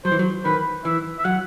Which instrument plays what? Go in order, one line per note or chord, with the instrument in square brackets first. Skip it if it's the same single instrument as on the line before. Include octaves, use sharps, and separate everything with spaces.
[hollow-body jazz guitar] F#3 [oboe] C5
[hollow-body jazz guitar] E3
F#3
[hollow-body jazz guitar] D#3 [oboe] B4
[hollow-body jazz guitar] E3 [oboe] E5
[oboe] E5
[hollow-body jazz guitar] F#3 [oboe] F#5